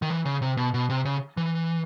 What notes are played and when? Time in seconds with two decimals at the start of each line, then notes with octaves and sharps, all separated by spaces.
0.02 D#3
0.10 E3
0.25 C#3
0.42 C3
0.57 B2
0.74 B2
0.90 C3
1.05 C#3
1.37 E3